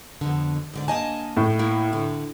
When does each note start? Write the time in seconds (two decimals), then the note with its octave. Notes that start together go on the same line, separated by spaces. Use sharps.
0.21 F2 B2 D3
0.74 G#2 D3 D5
0.88 A#3 D#5 G#5 A5
1.37 A2
1.59 A#3 E4
1.93 D3